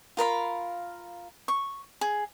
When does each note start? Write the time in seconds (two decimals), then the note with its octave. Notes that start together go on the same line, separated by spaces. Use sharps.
0.17 F4 A#4 F5 B5
1.48 C#6
2.01 G#4